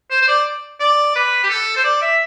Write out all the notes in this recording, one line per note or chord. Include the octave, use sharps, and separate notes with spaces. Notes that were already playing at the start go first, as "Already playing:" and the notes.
C5
C5
D5
D5
B4
G4
A4
C5
D5
E5